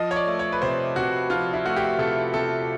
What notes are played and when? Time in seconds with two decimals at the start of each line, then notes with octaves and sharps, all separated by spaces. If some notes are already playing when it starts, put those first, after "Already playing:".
Already playing: F3 D#5
0.11 C#5
0.16 D5
0.27 A3
0.39 C#5
0.52 B4
0.62 C3 C5
0.96 C3 F#4
1.30 F3 F4
1.53 E4
1.65 A3 F#4
1.77 G4
1.99 C3 A4
2.34 C3 A4